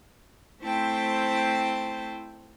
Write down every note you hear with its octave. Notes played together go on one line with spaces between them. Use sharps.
A3 C4 E4 C5 G5 A5